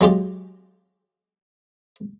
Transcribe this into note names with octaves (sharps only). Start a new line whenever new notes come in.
F#3 G#3 F4 G4